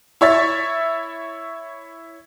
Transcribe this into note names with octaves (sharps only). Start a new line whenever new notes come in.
E4 C#5 E5 A6